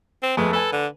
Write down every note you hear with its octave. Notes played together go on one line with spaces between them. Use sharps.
C4
F2 G#3 A3 B3
A4 B4 G#5
D3